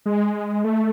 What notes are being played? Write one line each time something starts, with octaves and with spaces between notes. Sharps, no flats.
G#3
A3